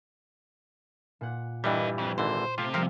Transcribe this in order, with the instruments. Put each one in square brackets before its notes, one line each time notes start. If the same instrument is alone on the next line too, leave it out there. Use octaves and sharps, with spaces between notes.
[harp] A#2 F#5
[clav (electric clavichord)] G2 E3 G3 [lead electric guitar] G4 D#5
[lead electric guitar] F2
[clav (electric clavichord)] G#1 D3 E3 [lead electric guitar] C5
[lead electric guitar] C3 [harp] A3 [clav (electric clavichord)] F4
[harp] F3 G3 [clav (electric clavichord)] C4 A#4 F5